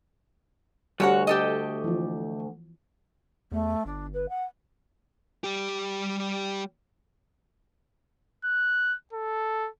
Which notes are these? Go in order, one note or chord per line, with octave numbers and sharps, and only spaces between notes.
D2 G3 F#4 C#5 F#5
G4 A4 D#5
E3 F3
E2 A3
G1 D4
B4
F#5
G3 G4
F#6
A4